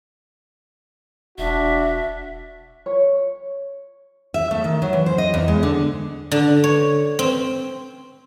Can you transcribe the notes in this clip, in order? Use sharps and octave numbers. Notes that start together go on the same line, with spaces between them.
E1 D4 F#4 E5
C#5
E5
A3
D#3
F#3
E3
C5
D#5
E2
G#3
D3
D3
C#5
C4